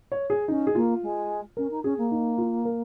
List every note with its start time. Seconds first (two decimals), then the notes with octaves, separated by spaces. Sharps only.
0.12 C#5
0.30 G#4
0.48 C#4 D#4
0.67 G#4
0.75 A#3 F4
1.02 G#3
1.57 C#4 A#4
1.70 D#4
1.84 C#4 G#4
1.97 A#3
2.11 D#4
2.38 F4
2.65 A#4